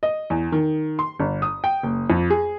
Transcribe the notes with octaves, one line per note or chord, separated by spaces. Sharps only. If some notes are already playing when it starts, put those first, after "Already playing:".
D#5
E2
D#3
C6
G1
D#6
G5
F#1
F2
G#4